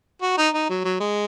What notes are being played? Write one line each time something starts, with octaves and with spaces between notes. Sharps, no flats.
F#4
D#4
D#4
F#3
F#3
G#3